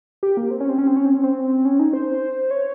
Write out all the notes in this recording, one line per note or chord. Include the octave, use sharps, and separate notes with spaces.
G4
A#3
C4
C#4
C4
C#4
C4
C#4
C4
C#4
C4
C#4
D#4
C5
C#5